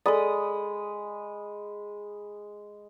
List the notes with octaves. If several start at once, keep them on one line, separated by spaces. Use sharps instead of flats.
G#3 A4 D5 B5 D#6